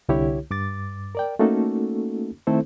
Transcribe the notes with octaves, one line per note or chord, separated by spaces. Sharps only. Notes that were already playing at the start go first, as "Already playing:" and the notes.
C2 D3 E4 G4 C#5
G2 D6 A6
A#4 D5 G5
A3 A#3 C#4 D#4 F#4 A4
D#3 A3 C4 E4 A4 C5